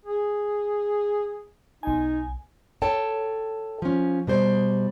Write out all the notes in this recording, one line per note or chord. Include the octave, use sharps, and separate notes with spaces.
G#4
B1 D#4 G#5
A4 C#5 G5 A5
F3 C#4
B2 G3 C5 D5